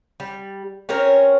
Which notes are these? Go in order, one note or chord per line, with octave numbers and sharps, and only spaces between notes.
G3
C4 C#4 A#4 C#5